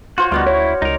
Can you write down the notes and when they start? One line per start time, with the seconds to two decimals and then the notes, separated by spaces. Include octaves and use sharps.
0.18 F4 F#4 C5 C#5
0.32 D2 G3 B3 D#4 F#4 D5 F5
0.47 E4 C#5
0.82 C#2 D#4 A#4